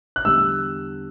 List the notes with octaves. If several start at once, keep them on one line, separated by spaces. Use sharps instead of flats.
F#6
E2 D3 G3 E6